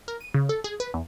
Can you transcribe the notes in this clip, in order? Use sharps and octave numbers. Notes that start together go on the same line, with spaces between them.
A#4
D#7
C#3
A4
G#4
B4
E2